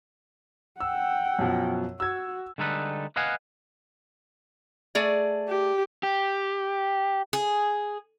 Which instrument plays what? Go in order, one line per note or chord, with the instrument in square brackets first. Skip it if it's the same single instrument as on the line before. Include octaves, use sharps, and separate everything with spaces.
[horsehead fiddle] F#5 G5 [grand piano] E6
[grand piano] F#2 B2 F3
[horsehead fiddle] F#4 [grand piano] E6 G#6
[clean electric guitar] D3 G3 G#3 D#4 A4 B4
B4 D#5 F5 F#5 G#5
[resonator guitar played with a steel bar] A3 G#4 D5
[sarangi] G4
[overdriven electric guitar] G4
[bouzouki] G#4